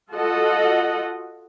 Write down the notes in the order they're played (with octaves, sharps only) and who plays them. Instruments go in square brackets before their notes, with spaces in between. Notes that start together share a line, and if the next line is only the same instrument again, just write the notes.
[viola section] F4 F#4 A4 D#5 F#5